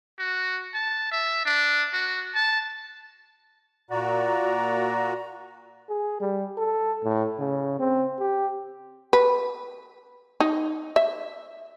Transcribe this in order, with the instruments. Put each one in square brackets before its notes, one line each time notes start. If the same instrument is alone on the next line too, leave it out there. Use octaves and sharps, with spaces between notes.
[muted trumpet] F#4
A5
E5
D4
F#4
A5
[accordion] A#2 F#4 [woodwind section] D5 A#5
[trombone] G#4
G3
A4
A2
C#3
C4
G4
[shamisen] B4
D#4
E5